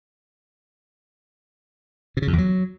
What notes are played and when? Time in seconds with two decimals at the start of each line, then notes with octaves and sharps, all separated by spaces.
2.17 C3
2.22 C#3
2.27 F2
2.33 E2
2.38 F#3